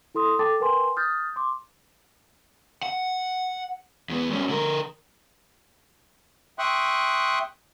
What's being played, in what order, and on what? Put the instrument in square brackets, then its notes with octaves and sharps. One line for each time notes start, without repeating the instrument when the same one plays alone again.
[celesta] E4 A4 C6 D#6
A4 G5 A5 D6 A6
A#4 B4 G5 G#5 C6
D#6 F6 G6 A6
C6 D6
[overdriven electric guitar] F#5
E2 B3
G2 C#4
D3 A#4
[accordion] E5 G5 C6 C#6 D#6 F#6